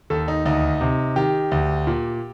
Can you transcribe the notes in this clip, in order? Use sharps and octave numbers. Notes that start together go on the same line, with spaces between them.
D#2 A4
D#4
D2 D#4
C3
D#3 G4
D2
A#2